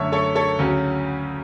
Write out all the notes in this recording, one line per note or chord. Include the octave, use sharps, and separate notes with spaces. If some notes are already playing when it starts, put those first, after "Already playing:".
Already playing: F#2 D3 A3 C#4 C#5 E5
A4 C#5
A4 C#5
D2 C#3 F#3 C#4